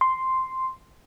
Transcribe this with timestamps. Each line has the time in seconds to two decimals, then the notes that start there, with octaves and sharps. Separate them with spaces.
0.01 C6